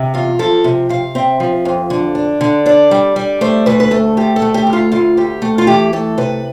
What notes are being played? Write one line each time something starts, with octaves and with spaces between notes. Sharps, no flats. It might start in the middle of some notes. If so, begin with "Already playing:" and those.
Already playing: C3
E2 F4
F3 A4
C3
C3 F5
C4 E5
F3
F2
D3
D4
D3
D4 D5
G3
G3
A3 C5
D2 B4
B4
A3 A4
D2 G4
A4
A3
G4
D2
F4
D2 F4
D2 G4
A3
F4
E3 G4
A3 A4
C3 B4